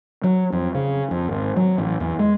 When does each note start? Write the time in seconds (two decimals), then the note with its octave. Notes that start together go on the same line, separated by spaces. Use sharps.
0.24 F#3
0.52 F2
0.75 C#3
1.11 F2
1.29 G#1
1.57 F#3
1.78 A1
2.00 E2
2.19 G#3